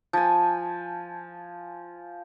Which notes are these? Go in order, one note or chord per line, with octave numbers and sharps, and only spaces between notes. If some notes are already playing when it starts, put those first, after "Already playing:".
F3 G#5